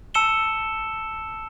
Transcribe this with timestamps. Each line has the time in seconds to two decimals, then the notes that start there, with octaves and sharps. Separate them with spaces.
0.14 A5 E6 C#7 E7 G7